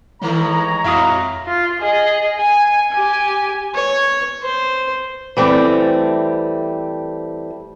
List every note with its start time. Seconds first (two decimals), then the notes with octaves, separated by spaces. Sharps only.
0.22 A2 D#3 E3 G#3 A3 C#5 A#5
0.84 F2 A2 E4 F#4 E5 F5 D#6
1.47 F4
1.81 G#4 D#5
2.37 G#5
2.92 G4 G#5
3.75 C#5
4.42 C5
5.37 E3 G3 A3 C4